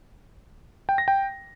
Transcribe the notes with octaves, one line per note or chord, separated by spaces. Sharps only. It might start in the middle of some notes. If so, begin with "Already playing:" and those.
G5
A#6
G5